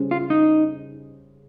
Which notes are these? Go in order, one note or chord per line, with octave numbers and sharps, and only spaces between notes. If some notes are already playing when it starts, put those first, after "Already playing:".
Already playing: C#3 G3 C#4 G#4 C5
F4
D#4